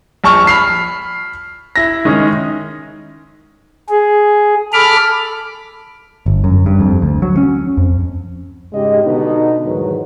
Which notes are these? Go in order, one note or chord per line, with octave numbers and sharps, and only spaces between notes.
A#1 A5 C#6 F6
B5 F6 C7
E4 A#6
D#3 G#3 C#4 D#4
G#4
A4 B5 D6 F6
G1
F#2
G2
F2
D2
F#3
C#4
F2
G#2 C#3 G#3 G4 D#5
B2 D3 B3 D#4
E2 G#2 D#3 F#3 B4